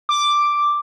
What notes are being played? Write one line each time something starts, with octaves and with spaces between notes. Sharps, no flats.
D6